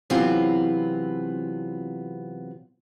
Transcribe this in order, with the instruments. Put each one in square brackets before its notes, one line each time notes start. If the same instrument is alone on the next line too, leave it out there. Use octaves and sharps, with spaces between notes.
[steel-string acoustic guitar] C3 E3 F#3 B3 C4 F4